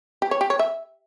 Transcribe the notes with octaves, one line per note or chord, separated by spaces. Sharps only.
G4
C#5
G4
C#5
E5